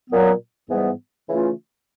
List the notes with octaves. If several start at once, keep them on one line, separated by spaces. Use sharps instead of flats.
A#2 F#3 B3
G#2 E3 G3 B3
C#3 E3 A3 C#4 F4